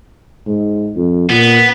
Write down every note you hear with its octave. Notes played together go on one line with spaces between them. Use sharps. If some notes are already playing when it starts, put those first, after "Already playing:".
G#2
F2
A#2 B3